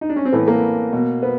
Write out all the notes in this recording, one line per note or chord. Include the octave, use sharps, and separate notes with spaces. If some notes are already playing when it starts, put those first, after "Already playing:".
D#4
D4
C#4
C4
A2 E3 B3
A#3
B2
B3